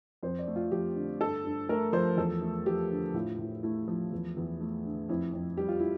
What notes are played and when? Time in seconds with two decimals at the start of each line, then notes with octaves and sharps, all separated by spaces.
0.23 F2 C5
0.39 D5
0.47 A3
0.56 F4
0.71 F3 G4
0.95 D3
1.20 G2 A4
1.45 G2
1.69 A3 A#4
1.92 F3 C5
2.17 E2 A4
2.42 A3
2.66 F3 G4
2.91 D3
3.14 A2 F4
3.38 A2
3.63 A3 E4
3.88 F3
4.12 E2
4.37 E2
4.61 A3
4.85 D3
5.09 F2 E4
5.33 F2
5.57 G3 G4
5.69 F4
5.79 E4